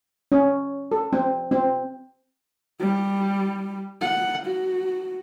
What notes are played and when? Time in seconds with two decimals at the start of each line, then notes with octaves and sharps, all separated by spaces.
0.32 C#4
0.92 A4
1.13 C4
1.51 C4
2.80 G3
4.01 F#5
4.46 F#4